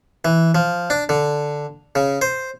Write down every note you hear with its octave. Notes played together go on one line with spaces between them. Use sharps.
E3
F3
D4
D3
C#3
C5